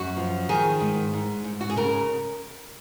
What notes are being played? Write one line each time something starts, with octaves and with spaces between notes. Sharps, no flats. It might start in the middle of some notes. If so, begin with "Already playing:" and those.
Already playing: F#2 F#4
F3
D#3 G#4
G#2
G#2
G#2
F#4
G#4
C#3 A#4